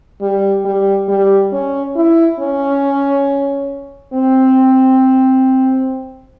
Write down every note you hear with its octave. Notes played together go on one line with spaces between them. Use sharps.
G3
G3
G3
C#4
E4
C#4
C4